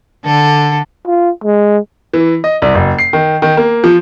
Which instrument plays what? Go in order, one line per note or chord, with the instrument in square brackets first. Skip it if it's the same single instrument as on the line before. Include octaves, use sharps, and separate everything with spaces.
[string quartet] D3 A4
[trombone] F4
G#3
[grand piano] E3
D#5
C2
F#1
C7
D#3
D#3
A#3
F3